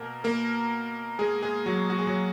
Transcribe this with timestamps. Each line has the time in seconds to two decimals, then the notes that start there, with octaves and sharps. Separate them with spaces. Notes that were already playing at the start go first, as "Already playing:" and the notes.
Already playing: B2 A#3 A#4
0.24 A#3 A#4
1.19 G#3 G#4
1.43 G#3 G#4
1.66 F#3 F#4
1.90 F#4
1.99 G#4
2.07 F#3 F#4